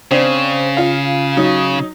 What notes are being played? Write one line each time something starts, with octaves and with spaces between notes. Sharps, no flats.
C#3 C4 D4
F4 F5
F#3 D#4